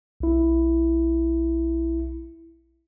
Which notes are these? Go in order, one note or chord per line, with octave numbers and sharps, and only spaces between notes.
B1 E4